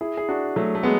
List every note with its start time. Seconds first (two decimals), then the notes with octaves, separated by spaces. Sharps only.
0.01 E4 G#4
0.17 G#4
0.29 D4 F#4
0.56 F#3 A3
0.75 A3
0.83 G#3 B3